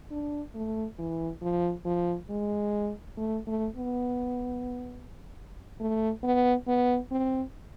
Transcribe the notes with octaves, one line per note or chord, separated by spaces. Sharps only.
D4
A3
E3
F3
F3
G#3
A3
A3
B3
A3
B3
B3
C4